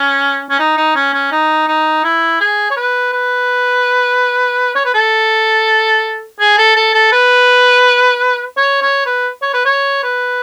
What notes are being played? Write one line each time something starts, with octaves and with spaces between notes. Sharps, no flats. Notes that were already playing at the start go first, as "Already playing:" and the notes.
Already playing: C#4
C#4
D#4
D#4
C#4
C#4
D#4
D#4
E4
G#4
C#5
B4
B4
C#5
B4
A4
G#4
A4
A4
A4
B4
C#5
C#5
B4
C#5
B4
C#5
B4